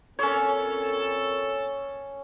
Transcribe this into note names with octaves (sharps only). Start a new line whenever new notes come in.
A#2 C4 C#4 A4 A#4 C#5